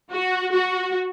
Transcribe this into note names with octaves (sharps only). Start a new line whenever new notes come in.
F#4
F#4